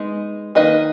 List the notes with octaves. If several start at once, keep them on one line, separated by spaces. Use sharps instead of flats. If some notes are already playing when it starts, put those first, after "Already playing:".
Already playing: G#3 B3 D#4
D#3 A#3 D#4 B4 D#5